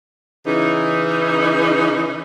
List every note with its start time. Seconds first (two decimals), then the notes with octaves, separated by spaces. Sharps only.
0.47 C#3 E3 D#4